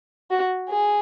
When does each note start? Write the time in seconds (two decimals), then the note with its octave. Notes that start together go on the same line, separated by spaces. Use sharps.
0.31 F#4
0.69 G#4